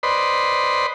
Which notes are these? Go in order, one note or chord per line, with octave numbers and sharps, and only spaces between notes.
B4 C5 D5 D#5 B5 C6